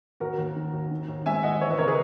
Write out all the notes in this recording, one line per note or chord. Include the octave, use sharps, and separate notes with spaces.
D#2 F#4 A#4
D#2
D#3
D#2
D#3
D#2
G#3 E5 G#5
D#2 D#5 F#5
E3 C#5 E5
B4 D#5
C#3 A#4 C#5
G#4 B4